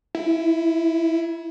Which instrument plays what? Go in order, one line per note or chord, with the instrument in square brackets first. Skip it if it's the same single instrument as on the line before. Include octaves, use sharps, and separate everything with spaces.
[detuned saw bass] E4